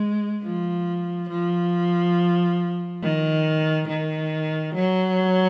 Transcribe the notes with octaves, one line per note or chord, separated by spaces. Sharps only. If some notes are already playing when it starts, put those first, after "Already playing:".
Already playing: G#3
F3
F3
D#3
D#3
F#3